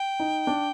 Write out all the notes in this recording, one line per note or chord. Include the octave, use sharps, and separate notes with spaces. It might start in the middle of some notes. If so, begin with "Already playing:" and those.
Already playing: G5
D#4
D4